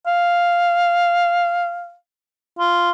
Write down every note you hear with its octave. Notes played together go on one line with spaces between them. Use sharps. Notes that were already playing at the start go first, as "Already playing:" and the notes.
F5
F4